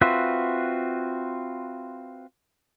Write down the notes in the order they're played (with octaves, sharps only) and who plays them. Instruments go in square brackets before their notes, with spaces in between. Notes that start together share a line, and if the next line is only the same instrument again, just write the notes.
[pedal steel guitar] C4 F4 F#4 B4 E5